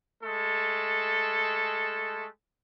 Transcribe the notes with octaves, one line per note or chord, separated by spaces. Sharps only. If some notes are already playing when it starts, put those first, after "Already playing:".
G#3 A3 A4